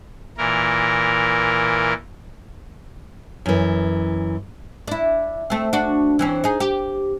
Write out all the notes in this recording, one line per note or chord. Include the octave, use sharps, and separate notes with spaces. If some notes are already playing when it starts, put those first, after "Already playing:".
A#2 E3 A#4
F#2 E3
D4 E4
A3 C4
D4 F#4
E3 C4 C#4
D#4 G#4
G4